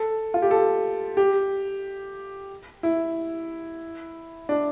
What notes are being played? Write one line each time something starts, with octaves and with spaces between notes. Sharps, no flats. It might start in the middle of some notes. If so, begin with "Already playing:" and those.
Already playing: A4
F4
G4
A4
G4
E4
D4